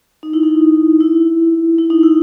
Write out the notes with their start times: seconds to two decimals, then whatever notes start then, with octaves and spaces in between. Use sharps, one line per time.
0.23 D#4
0.33 E4
0.43 D#4
1.00 E4
1.78 E4
1.90 D#4
2.03 E4